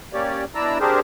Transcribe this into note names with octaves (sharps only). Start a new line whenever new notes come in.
A#3 C#4 G4 C#5 D5
B2 D4 E4 D5 A#5 E6
C4 D4 G4 G#4 A#4 C5